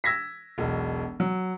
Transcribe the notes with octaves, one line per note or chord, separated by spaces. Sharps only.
E6 G#6 A#6 B6
E1 B1
F#3